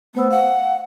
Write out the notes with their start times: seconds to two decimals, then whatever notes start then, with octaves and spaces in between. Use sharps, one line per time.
0.15 A3 B3 C5 E6
0.31 F5 F#5